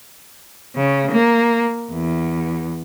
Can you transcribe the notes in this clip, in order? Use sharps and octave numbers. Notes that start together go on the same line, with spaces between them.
C#3
A#3
E2